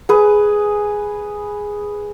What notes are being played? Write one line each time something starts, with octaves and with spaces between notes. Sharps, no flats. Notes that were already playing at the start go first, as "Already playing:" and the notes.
G#4 B4